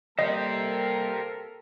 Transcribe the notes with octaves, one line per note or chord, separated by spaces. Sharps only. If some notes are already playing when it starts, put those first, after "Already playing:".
G3 A#3 G4 A4 A#4 C5 D#5